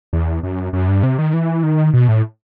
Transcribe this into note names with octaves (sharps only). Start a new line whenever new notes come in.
E2
F#2
F#2
G2
C3
D#3
E3
D#3
B2
A2